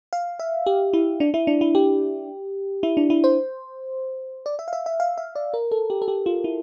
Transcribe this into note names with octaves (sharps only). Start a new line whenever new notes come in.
F5
E5
G4
E4
D4
E4
D4
E4
G4
E4
D4
E4
C5
D5
E5
F5
E5
E5
F5
E5
D5
A#4
A4
G4
A4
G4
F4
E4